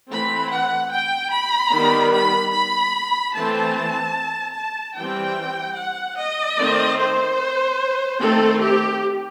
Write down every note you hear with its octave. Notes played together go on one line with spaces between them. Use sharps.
E3 A3 C4 B5
F#5
G5
B5
D#3 G3 B3
B5
B5
E3 A3 C4 A5
A5
E3 G3 C4 G5
F#5
D#5
D#3 A3 C4
C5
D#3 A3 C4 A4
G4